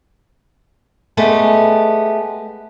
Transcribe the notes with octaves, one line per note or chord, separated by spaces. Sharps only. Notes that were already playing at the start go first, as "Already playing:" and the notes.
G#3 A3 B3 G4